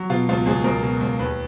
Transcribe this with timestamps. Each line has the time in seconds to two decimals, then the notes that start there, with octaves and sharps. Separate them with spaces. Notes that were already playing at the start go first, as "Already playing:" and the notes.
Already playing: F#3
0.10 B2 F4
0.29 C#2 F4
0.46 C#2 G#4
0.64 C#2 A#4
0.83 B2
1.01 C#2
1.19 D#2 B4